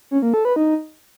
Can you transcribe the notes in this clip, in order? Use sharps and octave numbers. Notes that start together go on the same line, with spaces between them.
C#4
A#3
A4
B4
D#4